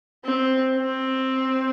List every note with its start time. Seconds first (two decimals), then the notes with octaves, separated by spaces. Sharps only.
0.25 C4
0.76 C4